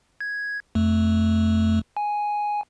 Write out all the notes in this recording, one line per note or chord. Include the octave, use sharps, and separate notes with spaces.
G#6
F2 A3
G#5